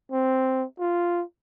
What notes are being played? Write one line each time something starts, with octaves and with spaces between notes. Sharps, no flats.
C4
F4